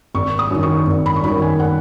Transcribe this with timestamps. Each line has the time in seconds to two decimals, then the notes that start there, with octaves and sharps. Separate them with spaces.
0.14 G#1 C#6
0.39 D#6
0.51 F#2 D#3
0.63 C#6
0.87 G#1
1.06 B5
1.16 C#6
1.24 F#2 D#3 B5
1.42 G#5
1.60 F#5